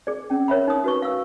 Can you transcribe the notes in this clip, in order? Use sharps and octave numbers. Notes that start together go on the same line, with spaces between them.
G#4 D5
C#4 G5
A#4 C#5 E5 B5
D#4 C#5 D#6
F#4 B4 C#6
F5 E6